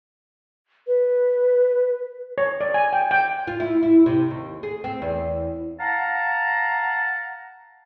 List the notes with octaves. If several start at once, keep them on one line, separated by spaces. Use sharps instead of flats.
B4
C#5
D5
G#5
G5
G5
F4
E4
E4
C3
D#2
G#4
C4
E2
F5 F#5 A5 A#5